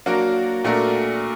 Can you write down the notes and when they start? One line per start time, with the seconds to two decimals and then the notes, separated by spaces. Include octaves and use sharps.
0.06 F#3 A#3 D4 F#4 A#4
0.64 A#2 A3 D4 F#4 A#4